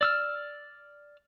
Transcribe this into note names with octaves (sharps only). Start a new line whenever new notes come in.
D5 E6 F6